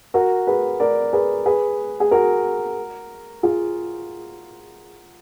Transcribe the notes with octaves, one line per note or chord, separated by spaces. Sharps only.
F#4 A#4
G#4 B4
A#4 D5
G#4 B4
G#4 B4
G#4
F#4 A#4
F4 G#4